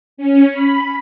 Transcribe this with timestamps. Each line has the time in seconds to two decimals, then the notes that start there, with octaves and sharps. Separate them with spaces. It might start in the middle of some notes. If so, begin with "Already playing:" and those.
0.17 C#4
0.53 B5